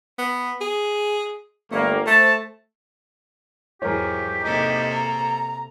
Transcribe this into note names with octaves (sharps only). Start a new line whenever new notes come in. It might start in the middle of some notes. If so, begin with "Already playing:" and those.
B3
G#4
G1 G3 A3 A#3
A3 C5 A5
E2 G#2 F#3 G4 G#4 A#4 C#5
C3 A#3 D#4 A4
A#5